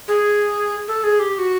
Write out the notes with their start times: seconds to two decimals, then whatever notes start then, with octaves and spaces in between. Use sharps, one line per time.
0.08 G#4
0.88 A4
1.04 G#4
1.20 G4
1.35 G4
1.39 F#4